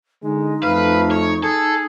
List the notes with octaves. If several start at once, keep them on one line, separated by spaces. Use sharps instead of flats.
D3 G#3 D#4
F2 A3 B4 F5
C#5
G#4 A4